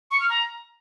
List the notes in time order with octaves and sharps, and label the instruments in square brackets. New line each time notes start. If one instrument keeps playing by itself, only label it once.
[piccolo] C#6
F6
A#5